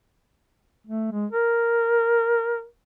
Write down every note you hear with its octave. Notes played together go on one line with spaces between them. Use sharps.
A3
G#3
A#4